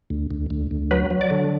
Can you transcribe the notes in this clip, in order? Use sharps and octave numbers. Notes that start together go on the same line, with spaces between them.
D2
D2
D2
D2
F#3 B4
F#3
D5
D3